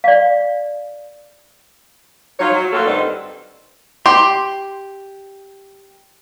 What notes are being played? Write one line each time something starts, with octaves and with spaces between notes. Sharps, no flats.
D5 F5
F#3 D#4 F4 C#5
F#3
A3 A#3 F4 F#4 A4
G2 D#3 C4 D#4 A4 D5
G4 C6